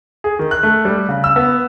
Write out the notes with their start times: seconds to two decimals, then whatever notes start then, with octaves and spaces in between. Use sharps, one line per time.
0.24 G#4
0.39 D#3
0.51 F#6
0.63 A3
0.85 G3
1.09 C#3
1.24 E6
1.36 B3